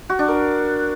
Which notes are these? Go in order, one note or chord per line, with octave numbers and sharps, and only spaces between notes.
F#4
D4
A#4